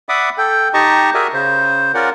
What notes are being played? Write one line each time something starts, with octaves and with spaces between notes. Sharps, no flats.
D5 E5 F#5 B5 D6 D#6
A4 G5
D#4 G4 D#5 A5 A#5 C#6
F#4 G#4 A#4 D5 E5 G#5
C#3 C5
C#4 F4 A#4 D5 F#5